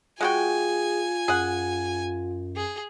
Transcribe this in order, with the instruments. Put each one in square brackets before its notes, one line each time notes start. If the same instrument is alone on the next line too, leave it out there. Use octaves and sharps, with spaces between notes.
[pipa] G#3 F#4 G5 [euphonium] F4 [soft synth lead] G#4 [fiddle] G#5
[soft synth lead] F#2 [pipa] G#4 F#5
[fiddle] G#4